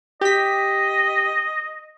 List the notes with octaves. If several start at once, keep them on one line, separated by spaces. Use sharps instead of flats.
G4 D#5 B6